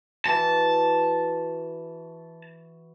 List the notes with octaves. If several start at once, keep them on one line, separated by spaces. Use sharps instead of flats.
E3 F#4 A5